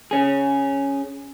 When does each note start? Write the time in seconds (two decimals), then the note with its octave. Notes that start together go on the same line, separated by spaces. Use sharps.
0.11 C#4 G#4